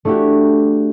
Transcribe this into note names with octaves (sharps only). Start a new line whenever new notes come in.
A3 D4 E4 F#4 G4